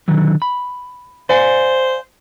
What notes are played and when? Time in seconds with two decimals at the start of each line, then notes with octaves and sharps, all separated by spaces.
0.08 D3 D#3 F#3
0.42 B5
1.29 C5 D5 F5 G#5